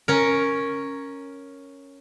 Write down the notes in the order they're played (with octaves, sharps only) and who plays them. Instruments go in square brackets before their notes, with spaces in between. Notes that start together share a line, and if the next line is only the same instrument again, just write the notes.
[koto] C#4 A#4